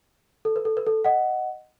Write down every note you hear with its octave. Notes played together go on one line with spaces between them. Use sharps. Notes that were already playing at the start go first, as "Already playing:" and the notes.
A4
B4
A4
B4
A4
D#5 F#5